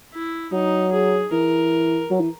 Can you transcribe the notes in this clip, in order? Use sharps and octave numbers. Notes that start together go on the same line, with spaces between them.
E4
F#3 D#4
G#4
E3 A#4
F#3
E3